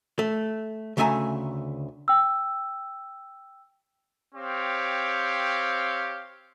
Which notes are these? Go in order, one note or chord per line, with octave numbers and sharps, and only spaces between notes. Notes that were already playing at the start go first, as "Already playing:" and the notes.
A3
D2 C#3 A3 E5 G#5 A#5
G5 E6
C4 G4 C#5 F5